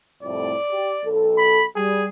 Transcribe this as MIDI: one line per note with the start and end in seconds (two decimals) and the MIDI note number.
0.23 0.52 36
0.23 0.52 41
0.23 0.52 45
0.23 1.09 74
0.70 0.91 67
1.05 1.62 35
1.05 1.62 69
1.38 1.64 83
1.76 2.08 55
1.76 2.04 68